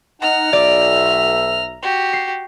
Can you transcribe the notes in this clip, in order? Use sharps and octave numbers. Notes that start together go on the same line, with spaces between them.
D#4 F#5 A#5 F6
B1 D5 E5
F#4 G4
C7